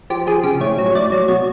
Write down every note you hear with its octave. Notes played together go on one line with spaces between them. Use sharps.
F3 G4
F3 G#4
C#3 G4
A2 C#5
F#3
C#5
A2 D5
F#3
B2 C#5